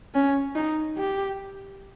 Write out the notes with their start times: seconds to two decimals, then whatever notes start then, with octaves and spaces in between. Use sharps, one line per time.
0.14 C#4
0.55 D#4
0.97 G4